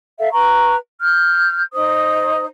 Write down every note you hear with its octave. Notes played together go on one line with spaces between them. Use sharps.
A4 E5 F5
B4 A#5 C#6
F6 G6
D#4 C5 D#6